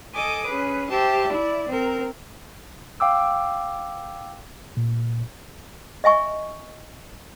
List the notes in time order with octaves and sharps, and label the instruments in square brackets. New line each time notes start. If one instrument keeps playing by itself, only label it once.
[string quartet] A4 D#5 G#5 D6 D#6
C#4 G#4 B4
G4 C5 E5 A5
E4 D5
C4 A#4
[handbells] F5 G5 D6 E6
[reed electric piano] A#2
[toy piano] D#5 E5 G#5 C#6